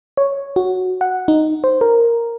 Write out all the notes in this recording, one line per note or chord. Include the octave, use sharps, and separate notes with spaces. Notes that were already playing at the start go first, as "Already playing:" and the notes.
C#5
F#4
F#5
D#4
C5
A#4